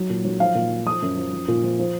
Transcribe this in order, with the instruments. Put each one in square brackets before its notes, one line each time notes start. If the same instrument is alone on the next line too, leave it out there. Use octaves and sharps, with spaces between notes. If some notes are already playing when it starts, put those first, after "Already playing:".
Already playing: [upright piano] F#3
A#2
F#3
F3 F5
A#2
F3
F3 D#6
F#2
F3
F3
A#2
F3
F3